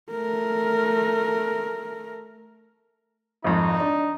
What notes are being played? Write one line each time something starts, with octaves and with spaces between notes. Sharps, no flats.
A3 A#4
G#1 F2 D#4
D4